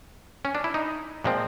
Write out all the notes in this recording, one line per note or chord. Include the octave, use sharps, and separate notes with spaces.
C#4
D4
E4
D#4
A#2 F3 G#3 C4